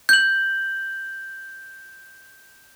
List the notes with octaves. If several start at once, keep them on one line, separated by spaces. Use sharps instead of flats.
G6 F#7